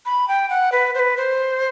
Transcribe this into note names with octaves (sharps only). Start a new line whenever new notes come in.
B5
G5
F#5
B4
C5
B4
C5